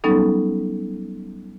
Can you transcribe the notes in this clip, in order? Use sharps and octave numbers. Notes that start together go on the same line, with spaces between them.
F#3 G3 B3 C#4 D#4 A4